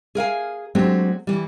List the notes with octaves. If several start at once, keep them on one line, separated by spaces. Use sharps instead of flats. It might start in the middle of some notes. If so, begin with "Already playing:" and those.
G#4 A#4 F5 G#5
F#3 G#3 A3 C4 D4 G4
E3 G3